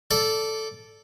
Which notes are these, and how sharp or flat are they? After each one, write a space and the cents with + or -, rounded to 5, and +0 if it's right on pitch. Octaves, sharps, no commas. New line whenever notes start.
A4 +0 D5 -10